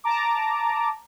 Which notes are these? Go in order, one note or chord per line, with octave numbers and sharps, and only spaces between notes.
A5 A#5 D6